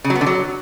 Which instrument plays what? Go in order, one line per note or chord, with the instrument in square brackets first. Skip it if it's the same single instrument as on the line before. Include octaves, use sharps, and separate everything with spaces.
[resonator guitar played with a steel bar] C#3
F#3
B3
D3
F#3